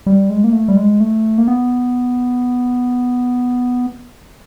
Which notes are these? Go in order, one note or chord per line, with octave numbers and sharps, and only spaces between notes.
G3
G#3
A#3
A3
G3
G#3
A3
A#3
B3